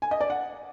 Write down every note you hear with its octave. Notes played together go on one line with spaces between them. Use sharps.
G#5
D#5
D5
F#5